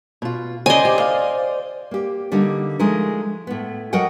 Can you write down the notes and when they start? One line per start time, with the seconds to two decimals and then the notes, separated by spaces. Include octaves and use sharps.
0.22 B2 F4
0.66 C#3 C5 D5 D#5 G#5
0.85 G4
1.00 F5
1.91 A#3 G4
2.32 D3 G3 A#3 D#4
2.79 F3 G#3 A3 D#4 A#4
3.47 A2 B3
3.93 F#3 A#4 D#5 F#5 G5